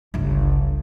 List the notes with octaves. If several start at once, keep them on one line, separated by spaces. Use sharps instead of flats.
G1 C#2